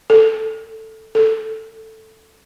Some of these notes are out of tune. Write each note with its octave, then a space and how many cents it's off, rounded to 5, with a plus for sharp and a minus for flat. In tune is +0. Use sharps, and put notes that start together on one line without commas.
A4 +5
A4 +5